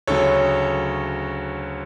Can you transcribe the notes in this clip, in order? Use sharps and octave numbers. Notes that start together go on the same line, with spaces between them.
D2 C#3 F#3 A4 C#5